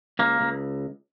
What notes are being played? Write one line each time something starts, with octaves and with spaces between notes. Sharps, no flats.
C#2 A#3
C#2